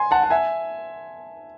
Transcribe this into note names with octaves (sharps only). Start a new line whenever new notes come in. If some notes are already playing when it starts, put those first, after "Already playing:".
Already playing: G#5 C6
F#5 A5
F#5
E5 G#5